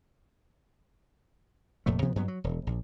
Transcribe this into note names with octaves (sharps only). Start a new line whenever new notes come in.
F1 F2 A#2 A3
D2 C3 F3 B3
G2 F#3 B3
F#3
E1
A#1